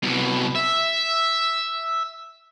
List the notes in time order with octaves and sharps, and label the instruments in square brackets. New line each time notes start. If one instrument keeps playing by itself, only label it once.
[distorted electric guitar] C2 B2
E5